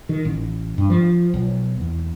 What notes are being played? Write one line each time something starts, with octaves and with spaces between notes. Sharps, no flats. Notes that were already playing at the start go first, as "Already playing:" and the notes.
D#3
A1
G2
F3
B1
E2